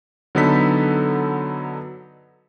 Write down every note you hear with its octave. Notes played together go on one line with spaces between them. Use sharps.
D3 F#3 B3 D#4 A4 B6